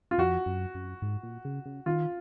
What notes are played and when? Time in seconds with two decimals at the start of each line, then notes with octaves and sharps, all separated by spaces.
0.11 F4
0.18 F2 F#4
0.46 F#2
0.74 F#2
1.02 G#2
1.23 A#2
1.45 C#3
1.66 C#3
1.86 D#3 F4